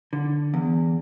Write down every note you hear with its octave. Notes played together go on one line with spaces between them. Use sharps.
D3
E2